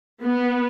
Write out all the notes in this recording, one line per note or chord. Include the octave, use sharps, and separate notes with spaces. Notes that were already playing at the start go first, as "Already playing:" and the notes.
B3